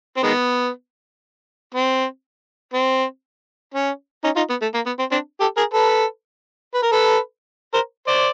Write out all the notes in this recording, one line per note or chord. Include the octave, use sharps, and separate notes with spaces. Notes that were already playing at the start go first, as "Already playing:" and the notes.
C4
D#3 G#3 B3
C4
C4
C#4
C#4 D#4
D#4 F4
B3
A3
A#3
B3
C4
C4 D4
G4 A4
G#4 A#4
A4 B4
B4
A#4
A4 B4
A#4 C5
C5 D5